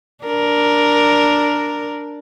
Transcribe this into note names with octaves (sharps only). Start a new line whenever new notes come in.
D4 A#4